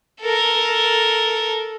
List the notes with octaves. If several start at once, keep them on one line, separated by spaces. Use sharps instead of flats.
A4 A#4